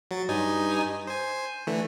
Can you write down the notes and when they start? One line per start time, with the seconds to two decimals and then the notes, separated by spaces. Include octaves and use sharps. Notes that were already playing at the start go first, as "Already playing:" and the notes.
0.11 F#3 A6
0.29 G2 D#4 G#5
1.07 C5 G#5
1.67 D3 E3 A3